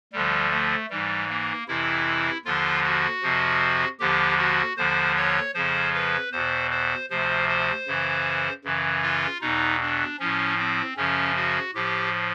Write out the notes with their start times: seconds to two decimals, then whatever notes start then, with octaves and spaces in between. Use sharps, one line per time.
0.13 D2 D3 F3 G3
0.51 A3
0.90 G#2 E3 G3
1.29 A#3
1.68 F2 C3 E3 E4
2.45 D#2 D3 F3 F4
2.84 F#4
3.23 F2 C3 F3
4.00 D#2 D3 F3 G4
4.38 F#4
4.77 D#2 D3 F3 C5
5.17 C#5
5.54 F2 C#3 F3 C5
5.94 B4
6.32 E2 B2 C5
6.71 C5
7.10 D2 C3 F3 C5
7.49 C5
7.87 F#2 C#3 E3
8.64 F#2 C#3 E3
9.03 F4
9.41 E2 B2 D#4
9.81 D4
10.19 A2 F3 C#4
10.59 C4
10.97 F#2 C#3 F3 C#4
11.36 F#4
11.74 A2 F3 G4